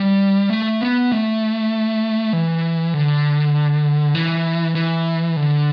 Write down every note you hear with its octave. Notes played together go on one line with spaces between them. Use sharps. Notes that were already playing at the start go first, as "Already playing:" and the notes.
Already playing: G3
A3
B3
A3
E3
D3
E3
E3
D3